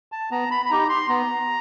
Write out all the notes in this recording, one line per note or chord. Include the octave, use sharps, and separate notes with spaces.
A5
B3 A#5
B5
B5
D#4 G4 A#5
C6
B3 A#5